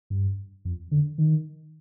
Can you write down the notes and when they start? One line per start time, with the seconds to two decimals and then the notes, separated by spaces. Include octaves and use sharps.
0.10 G2
0.65 F2
0.91 D3
1.18 D#3